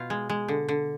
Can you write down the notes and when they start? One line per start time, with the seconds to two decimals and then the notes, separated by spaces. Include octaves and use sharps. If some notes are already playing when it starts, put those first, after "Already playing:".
Already playing: B2 F4
0.10 G#3
0.29 G#3
0.48 D3
0.69 D3